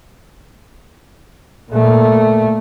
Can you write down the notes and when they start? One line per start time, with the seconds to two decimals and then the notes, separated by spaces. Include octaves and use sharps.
1.72 A#2 A3